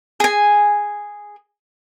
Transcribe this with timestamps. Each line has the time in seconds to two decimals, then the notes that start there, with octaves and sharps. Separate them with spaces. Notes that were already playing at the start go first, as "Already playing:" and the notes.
0.20 G#4 G#5